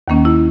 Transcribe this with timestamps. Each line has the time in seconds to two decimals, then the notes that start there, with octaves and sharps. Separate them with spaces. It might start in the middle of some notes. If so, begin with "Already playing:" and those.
0.08 D#2 D#3 A#3 C#4
0.25 E4